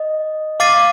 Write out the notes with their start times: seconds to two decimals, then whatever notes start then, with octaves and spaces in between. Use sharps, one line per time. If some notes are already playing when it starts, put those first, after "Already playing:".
Already playing: D#5
0.60 F5 D6 A6 C7 D#7